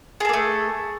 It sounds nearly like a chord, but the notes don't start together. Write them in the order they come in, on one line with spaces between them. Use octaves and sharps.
G#4 A4 A#3 A3